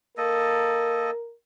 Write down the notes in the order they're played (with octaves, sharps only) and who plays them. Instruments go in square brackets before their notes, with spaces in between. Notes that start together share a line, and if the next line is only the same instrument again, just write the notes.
[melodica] A#3 A4 D#5 [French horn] A#4